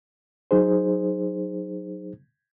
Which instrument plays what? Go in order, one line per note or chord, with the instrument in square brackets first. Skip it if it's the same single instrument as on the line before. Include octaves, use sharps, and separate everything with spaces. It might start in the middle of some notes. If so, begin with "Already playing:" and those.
[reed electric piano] F#3 D#4 G#4 C5